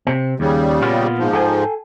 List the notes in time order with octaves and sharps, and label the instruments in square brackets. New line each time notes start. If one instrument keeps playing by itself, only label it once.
[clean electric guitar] C3 C4
[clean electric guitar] D#2 [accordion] C#3 G3
[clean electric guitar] A#2 B3 F4
[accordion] G#2 F3
[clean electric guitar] A4 G5 G#5